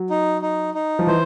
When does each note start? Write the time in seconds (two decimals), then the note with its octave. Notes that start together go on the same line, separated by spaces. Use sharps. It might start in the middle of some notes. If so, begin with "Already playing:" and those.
Already playing: F#3
0.10 D#4
0.42 D#4
0.74 D#4
0.99 F3
1.07 E3 C5